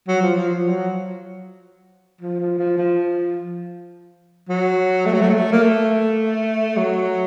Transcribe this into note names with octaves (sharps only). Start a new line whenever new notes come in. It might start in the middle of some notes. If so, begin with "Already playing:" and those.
F#3
F3
F3
F3
F#3
F3
F3
F3
F3
F#3
A3
F#3
A3
F#3
A3
A#3
A3
F#3